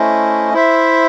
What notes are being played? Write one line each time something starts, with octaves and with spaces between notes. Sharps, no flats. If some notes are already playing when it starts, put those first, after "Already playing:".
Already playing: A3 C#4 E4 C5 D#5
E4 C5 E5